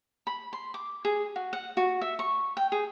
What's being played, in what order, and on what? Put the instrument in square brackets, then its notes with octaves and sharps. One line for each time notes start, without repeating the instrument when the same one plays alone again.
[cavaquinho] B5
C6
D6
G#4
F#4
F#5
F#4
E5
C#6
G5
G#4